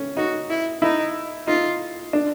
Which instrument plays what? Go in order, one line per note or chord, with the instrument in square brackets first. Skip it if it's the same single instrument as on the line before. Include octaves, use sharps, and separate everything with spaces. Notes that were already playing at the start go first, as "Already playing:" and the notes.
Already playing: [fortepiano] C#4
[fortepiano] D#4 [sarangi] F#4
[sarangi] E4
[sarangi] D#4 [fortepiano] E4
[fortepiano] D#4 [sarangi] F4
[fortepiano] D4